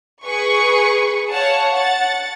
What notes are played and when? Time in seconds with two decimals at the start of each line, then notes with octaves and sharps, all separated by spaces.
0.24 G#4 B4 C#6
1.30 C#5 F5 F#5 A5
1.71 F#5 A6